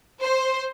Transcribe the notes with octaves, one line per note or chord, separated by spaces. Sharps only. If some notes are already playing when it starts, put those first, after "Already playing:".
C5